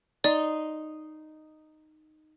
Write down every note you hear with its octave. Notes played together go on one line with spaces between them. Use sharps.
D#4 D5 C6